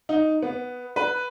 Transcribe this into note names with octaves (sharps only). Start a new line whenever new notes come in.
D#4
B3
B4